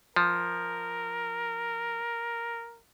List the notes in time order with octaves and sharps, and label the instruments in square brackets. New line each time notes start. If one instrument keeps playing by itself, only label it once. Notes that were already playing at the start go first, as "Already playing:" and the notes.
[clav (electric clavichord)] F3 [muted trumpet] A#4